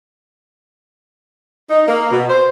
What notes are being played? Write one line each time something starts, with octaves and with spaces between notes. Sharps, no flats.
D#4
A#3
B2
C5